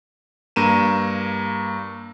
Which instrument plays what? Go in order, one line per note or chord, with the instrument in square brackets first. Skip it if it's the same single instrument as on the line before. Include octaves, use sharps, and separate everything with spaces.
[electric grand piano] G2 A#3 A#5 D#7 E7